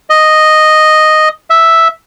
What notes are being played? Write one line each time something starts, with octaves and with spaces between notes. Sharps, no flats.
D#5
E5